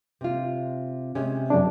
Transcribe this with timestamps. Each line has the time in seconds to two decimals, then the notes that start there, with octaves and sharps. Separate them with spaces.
0.21 C3 F4
1.15 C3 G#3 C#4
1.50 F#2 C#3 D4